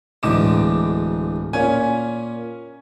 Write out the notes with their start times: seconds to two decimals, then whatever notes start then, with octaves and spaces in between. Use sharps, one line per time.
0.23 D1 D2 E3 G#3 D6 E7
1.53 A#2 C#4 G#5